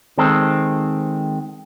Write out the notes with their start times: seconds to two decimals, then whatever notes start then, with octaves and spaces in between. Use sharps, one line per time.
0.18 D#3 G#3 C4 A4